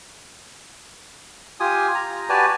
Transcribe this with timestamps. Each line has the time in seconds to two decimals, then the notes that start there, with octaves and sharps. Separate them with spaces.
1.60 F4 G4 G#5 D#6
1.95 A#5
2.29 F#4 G4 B4 D5 G#5 A5